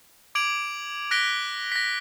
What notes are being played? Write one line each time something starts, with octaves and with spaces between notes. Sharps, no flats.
D6 G#6 D7 F7 F#7
F#6 A#6 B6 D7 G7
A#6 B6